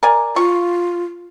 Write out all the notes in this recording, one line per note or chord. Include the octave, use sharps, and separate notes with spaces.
A#4 D5 G#5
F4 C#6